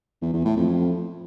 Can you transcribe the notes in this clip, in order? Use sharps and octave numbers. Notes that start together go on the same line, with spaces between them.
E2
E2
A2
F2